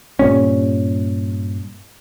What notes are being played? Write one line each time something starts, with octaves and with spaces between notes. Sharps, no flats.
G2 A#2 C#4